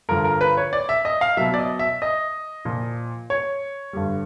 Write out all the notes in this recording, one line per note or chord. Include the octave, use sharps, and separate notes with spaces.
G2 D3 F3 A#4
A#4
B4
C#5
D5
E5
D#5
F5
B2 F#3 E5
D5
D#5
E5
D#5
A#2 F3
C#5
G2 D3 G3